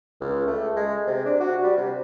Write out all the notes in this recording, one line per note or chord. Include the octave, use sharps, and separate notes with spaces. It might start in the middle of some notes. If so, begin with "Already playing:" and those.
C#2
A3
G#3
C3
D4
F#4
G3
C3